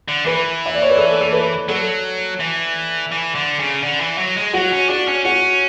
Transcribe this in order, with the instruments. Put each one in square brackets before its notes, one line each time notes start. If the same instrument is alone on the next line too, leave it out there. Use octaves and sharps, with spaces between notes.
[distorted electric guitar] D3
[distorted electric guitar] E3 [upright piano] B4
[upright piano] E5
D5
C#5
B4
A4
A4
B4
[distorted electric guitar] F#3 [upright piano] A4
[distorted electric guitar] E3
E3
D3
C#3
D3
E3
F#3
G#3
[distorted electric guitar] F#3 [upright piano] F#4
[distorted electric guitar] C#4
[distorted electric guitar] D4 [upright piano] F#4
[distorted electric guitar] C#4
[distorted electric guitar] C#4 [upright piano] F#4